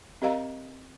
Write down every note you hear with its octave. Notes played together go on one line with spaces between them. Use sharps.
C4 G4 A#4 D#5 F5 A#5